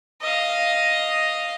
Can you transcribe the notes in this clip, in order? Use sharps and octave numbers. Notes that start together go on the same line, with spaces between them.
D#5 F5